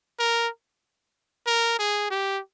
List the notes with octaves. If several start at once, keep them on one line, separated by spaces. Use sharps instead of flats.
A#4
A#4
G#4
G4